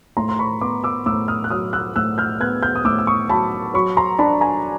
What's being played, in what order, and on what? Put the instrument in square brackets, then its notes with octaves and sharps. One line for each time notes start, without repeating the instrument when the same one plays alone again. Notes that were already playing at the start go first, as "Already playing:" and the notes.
[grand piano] A2 A#5 C6
C6
B5 C#6
B3 C6 D6
D6 E6
A2 D6 E6
D#6 F6
F#6
F#3 D#6 F6
E6 F#6
A2 E6 F#6
F6 G6
B3 F#6 G#6
F6 G6
D#6
A2 D6 E6
E6
C#6 D#6
F#3 A5 B5
F#3 B5 C#6
A#5 C6
D4 A5 B5
G#5 A#5